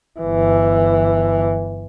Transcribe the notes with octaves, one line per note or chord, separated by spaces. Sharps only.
G1 E3